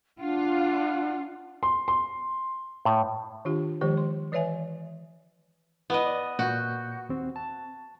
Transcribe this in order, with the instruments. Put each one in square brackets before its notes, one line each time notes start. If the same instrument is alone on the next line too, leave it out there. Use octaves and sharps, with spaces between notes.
[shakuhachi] D4 [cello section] F4 [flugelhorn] F#5
[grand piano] C6
C6
[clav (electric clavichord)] A2
[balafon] D#3 D4 F4 G4
D#3 F3 G#3 G4 C5
C6
E3 B4 C#5 D5 E5 G#5
[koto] B3 D#5 [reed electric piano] E4
[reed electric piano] D5
[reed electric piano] A#2 G6 [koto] F#4
[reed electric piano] D#2 C4
A5